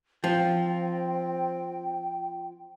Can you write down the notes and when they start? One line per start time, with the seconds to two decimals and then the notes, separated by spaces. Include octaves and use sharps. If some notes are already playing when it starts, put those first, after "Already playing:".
0.24 F3 C4 G5